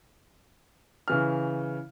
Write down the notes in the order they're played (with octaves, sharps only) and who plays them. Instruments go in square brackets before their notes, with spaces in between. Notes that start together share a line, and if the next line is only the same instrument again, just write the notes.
[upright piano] C#3 E3 F6